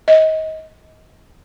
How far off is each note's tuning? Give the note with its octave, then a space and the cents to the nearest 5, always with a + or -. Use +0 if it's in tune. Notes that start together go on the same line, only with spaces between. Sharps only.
D#5 +25